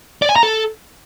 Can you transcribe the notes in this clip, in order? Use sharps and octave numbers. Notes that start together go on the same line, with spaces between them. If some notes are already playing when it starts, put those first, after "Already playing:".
D5
G#5
A#5
A4